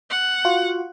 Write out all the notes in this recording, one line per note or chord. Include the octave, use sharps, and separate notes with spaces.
F#5
F4 F#4